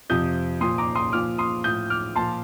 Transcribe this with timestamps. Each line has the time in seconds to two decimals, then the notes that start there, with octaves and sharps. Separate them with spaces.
0.09 F2 C3 F3 D#6 G6
0.61 A#2 F3 C6 D#6
0.78 A#5 D6
0.95 C6 D#6
1.12 A#2 F3 D6 F6
1.38 C6 D#6
1.64 A2 F3 D#6 G6
1.90 D6 F6
2.16 A#2 F3 A5 C6